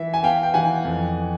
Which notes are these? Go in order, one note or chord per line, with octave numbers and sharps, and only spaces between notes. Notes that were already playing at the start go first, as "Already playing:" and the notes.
Already playing: E3 E5
G#5
B3 F5 G5
G5
E3 F#5 G#5
F2